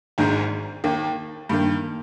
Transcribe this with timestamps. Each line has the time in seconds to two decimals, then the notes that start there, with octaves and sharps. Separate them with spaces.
0.18 G#1 G#2 D#3 G#3 D#4
0.84 D#2 D#3 A#3
1.49 G2 D#3 A#3